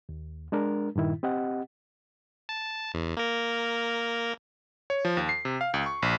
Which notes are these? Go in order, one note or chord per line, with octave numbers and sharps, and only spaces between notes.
D#2
G#3 D4 A#4
G2 A#2 D#3 E4
C4 G4 D#5 F#5
A5
E2
A#3 A#4
C#5
F3
D#2
C7
C3
F5
C#2
C#6
A#1